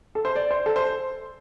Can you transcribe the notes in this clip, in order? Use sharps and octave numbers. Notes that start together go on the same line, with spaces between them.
A4
C5
D5
C5
A4
C5